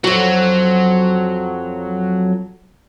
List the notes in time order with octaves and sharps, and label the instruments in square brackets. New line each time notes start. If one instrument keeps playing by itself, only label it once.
[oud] F2 F#4 [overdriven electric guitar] F#3